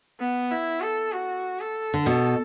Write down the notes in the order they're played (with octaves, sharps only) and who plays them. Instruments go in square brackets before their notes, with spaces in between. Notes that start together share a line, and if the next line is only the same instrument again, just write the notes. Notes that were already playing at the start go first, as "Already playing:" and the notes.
[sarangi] B3
E4
A4
F#4
A4
[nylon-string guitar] D3
[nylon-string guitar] B2 [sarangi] A4